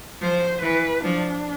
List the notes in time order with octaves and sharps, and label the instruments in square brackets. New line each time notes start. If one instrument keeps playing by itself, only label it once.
[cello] F3 [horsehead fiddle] C5
[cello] E3 [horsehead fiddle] B4
[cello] F3 [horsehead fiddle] D4